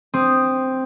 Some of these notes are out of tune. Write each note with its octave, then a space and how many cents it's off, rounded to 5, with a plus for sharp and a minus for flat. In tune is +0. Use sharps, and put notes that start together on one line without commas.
C4 +0 D#6 +0